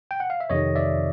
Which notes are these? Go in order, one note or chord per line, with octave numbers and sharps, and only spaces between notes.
G5
F#5
F5
E5
F2 C3 D#3 C#5 D#5
D5 E5